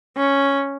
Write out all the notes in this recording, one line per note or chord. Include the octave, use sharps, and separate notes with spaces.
C#4